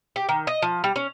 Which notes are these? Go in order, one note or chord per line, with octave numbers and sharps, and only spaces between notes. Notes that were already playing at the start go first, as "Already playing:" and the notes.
G4
D#3
D#5
F3
G3
C#4